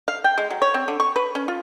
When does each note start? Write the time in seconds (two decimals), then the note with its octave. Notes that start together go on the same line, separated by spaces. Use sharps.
0.08 F5
0.24 G5
0.38 G#3
0.50 F#3
0.62 C#5
0.74 C4
0.88 D3
1.00 C#6
1.16 B4
1.35 C#4
1.48 F4